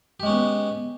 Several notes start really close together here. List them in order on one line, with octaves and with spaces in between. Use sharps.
G4 G#3 C#4 B3